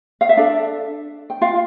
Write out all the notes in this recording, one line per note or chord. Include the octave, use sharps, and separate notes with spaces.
F5
E5
D4 A4 D5
G5
F4 F5